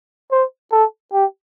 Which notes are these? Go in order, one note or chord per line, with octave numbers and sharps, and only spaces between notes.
C5
A4
G4